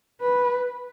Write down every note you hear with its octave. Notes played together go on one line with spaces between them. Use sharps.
B4